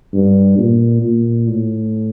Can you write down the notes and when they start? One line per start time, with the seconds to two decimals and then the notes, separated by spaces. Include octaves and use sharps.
0.13 G2
0.58 A#2
1.02 A#2
1.48 A2